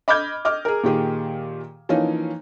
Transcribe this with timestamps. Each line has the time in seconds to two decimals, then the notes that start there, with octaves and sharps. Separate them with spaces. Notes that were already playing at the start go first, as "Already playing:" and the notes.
0.08 D#5 B5 D6 F6 G6 G#6
0.45 D#5 D6 F6
0.65 G#4 A#4
0.83 A#2 D#3 G4 G#4
1.89 E3 F3 A#3 C#4 D#4